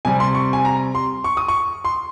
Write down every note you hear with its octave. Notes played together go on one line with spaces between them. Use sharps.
C3 G3 C4 G#5
C6
C#6
G#5
A#5
C6
C#6
D#6
C#6
C6